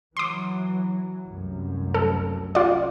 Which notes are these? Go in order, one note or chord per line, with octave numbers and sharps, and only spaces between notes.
E3 F#3 C6 D6
F1 C2 F#2
A4
F4 D5